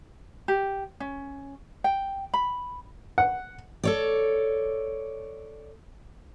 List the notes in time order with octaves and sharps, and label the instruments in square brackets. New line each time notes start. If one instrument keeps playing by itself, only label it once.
[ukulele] G4
C#4
G5
B5
[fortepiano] F#5
[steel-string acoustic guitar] A4 C#5 D5